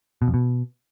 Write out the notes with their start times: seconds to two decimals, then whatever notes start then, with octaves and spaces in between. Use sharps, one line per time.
0.22 B2
0.28 F2
0.34 B2